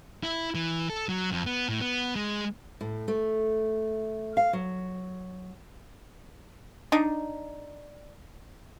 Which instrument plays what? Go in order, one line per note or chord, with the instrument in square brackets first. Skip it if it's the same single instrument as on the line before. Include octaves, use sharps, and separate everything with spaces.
[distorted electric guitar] E4
E3
A4
F#3
F2
B3
A2
B3
G#3
[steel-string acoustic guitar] A2
A3
F5
F#3
[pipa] D4 D#4